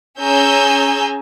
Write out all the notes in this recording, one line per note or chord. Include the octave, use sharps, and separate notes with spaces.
C#4 G#4 G#5 A#5 E6 G6